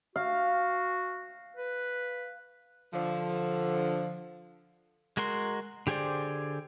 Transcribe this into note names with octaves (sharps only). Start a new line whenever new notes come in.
F#4 F5
B4
D3 F3
G#3 F#4 A#4 C6
D3 G4 G#4 C5 D5